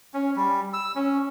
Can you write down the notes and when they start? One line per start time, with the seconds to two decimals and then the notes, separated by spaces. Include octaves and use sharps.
0.14 C#4
0.36 G3
0.73 E6
0.95 C#4